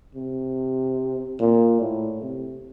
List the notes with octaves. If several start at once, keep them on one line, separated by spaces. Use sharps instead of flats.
C3
A#2
A2
C3